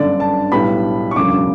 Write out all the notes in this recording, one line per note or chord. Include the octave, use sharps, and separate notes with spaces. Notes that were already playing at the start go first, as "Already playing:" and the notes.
Already playing: G1 F#2 D3 D5
A5
B1 A2 G3 B3 B5
C#6
E1 D2 C#3 F#3 D6